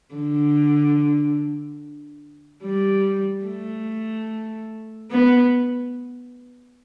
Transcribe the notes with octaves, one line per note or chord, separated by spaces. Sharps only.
D3
G3
A3
B3